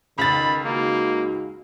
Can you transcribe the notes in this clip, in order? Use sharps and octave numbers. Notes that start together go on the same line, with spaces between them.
C#2 D#3 B5 A6
G#3 A#3 D#4 F#4